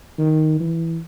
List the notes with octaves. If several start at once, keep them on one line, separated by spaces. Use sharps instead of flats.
D#3
E3